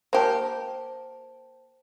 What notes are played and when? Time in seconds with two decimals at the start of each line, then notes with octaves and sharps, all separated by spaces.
0.13 A#3 G4 C5 A5